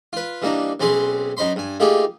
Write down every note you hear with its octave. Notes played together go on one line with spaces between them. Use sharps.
F4 B4
E3 G3 A#3 D4 D#4
B1 C4 C#4 G#4 B4 C6
F#2 D#4 C5 B5 C6
G2 G#5
A3 A#3 D#4 F4 G4 G#4